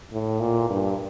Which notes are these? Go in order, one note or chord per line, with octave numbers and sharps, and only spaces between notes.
A2
A#2
G2